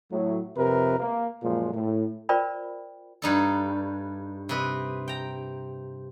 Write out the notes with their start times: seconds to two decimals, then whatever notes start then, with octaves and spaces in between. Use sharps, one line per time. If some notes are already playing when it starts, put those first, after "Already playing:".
0.11 A2 F#3
0.57 F2 C3 A#4 B4
0.99 A#3
1.43 F#2 A#2 F3 G#3
1.73 A2
2.29 F4 A#4 C5 D5 G5 B5
3.22 G2 D#4 A4
4.49 C3 B4 D#5
5.08 G5 A#5